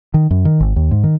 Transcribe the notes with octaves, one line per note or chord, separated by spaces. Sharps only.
D#3
F#2
D#3
G#1
D#2
G#2
D#3